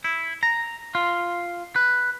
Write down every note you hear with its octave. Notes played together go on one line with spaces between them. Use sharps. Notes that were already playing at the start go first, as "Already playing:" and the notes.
E4
A#5
F4
B4